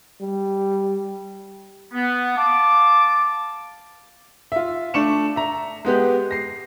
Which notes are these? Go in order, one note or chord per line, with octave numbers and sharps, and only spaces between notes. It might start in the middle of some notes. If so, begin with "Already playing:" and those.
G3
B3
F5 A5 D6
F4 E5
A3 D4 C#6 C#7 E7
E5 A#5
G#3 B3 G4
A#6 C7